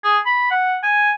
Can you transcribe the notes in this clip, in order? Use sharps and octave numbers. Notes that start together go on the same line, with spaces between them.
G#4
B5
F#5
G#5